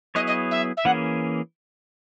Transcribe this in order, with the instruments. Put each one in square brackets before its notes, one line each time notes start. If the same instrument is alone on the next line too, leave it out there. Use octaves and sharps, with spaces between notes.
[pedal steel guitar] F#3 B3 E4 G#4 C#5 [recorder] D#5
[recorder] D#5
E5
E5
[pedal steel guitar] E3 A#3 C#4 G#4 [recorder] F#5